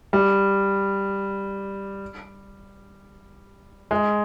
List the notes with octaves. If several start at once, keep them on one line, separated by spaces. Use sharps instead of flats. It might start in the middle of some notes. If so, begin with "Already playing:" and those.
G3
G#3